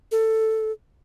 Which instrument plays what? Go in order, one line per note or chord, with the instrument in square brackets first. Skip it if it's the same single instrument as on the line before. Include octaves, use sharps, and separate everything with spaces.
[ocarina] A4